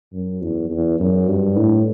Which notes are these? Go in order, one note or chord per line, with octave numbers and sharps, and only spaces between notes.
F#2
E2
E2
F#2
G2
A2